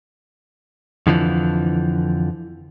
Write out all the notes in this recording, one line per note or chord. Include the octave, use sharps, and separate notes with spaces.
F2 D3 E3 F3